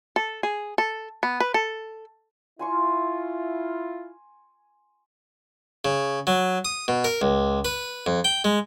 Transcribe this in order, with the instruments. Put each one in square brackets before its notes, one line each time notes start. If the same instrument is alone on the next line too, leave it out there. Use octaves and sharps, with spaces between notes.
[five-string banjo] A4
G#4
A4
B3
B4
A4
[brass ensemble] E4 F4 [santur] G#5 C6 C#6
[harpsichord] C#3
F#3
D#6
B2
A#4
C#2
B4
F2
G5
G#3